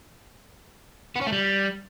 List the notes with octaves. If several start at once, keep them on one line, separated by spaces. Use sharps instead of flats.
B3
C#4
A3
G3